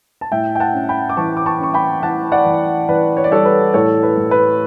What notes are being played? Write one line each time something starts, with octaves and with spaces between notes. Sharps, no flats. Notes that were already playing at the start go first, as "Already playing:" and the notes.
A5
A2 E5 G5
G5
F#5 A5
C#4
G5 B5
D6
E3 A5 C#6
D6
A5 C#6
C#4 C#6
G5 B5
E3 F#5 A5
D5 F#5
E3
E3 B4 D5
C#5
D5
G3 A4 C#5
B4
A2 A4 C#5
B4
A2
B4